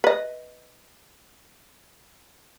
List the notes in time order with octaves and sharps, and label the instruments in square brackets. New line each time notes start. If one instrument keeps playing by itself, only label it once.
[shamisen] B4 D#5